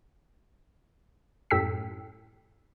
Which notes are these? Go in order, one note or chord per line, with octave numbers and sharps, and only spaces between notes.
F#2 A2 G4 G5 E6 B6